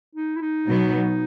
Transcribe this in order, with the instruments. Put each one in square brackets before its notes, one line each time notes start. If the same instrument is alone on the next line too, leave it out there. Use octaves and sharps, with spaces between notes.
[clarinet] D#4
E4
D#4
[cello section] B2 F#3 B3